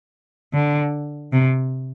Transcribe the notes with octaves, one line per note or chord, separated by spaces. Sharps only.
D3
C3